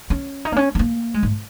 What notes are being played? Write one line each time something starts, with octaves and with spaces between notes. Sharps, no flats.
C#4
D#4
A#3
C#4
G#3
A#3
G#3
G#2